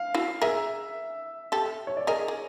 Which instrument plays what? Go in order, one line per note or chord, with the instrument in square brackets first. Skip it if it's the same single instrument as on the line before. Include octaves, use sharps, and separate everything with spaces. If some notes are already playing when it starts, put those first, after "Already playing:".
Already playing: [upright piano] F5
[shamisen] E4 F#4
[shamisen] G#4 A#4 [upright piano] E5
[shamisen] G4 A4
[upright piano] C#5
D5
[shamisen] G#4 A#4 [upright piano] D#5
[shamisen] G#4